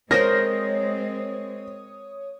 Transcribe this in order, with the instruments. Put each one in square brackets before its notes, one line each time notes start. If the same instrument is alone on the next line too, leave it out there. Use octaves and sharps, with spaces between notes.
[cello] G#3 C4 [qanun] A#4 C5 [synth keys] C#5 D#6 [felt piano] A#6